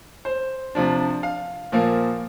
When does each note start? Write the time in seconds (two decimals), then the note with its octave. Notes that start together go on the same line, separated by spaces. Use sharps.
0.25 C5
0.75 C3 F3 D4
1.23 F5
1.72 A#2 F3 A#3